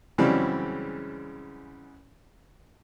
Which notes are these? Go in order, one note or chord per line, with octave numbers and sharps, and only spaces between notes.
F#2 C#3 E3 G3 G#3 C4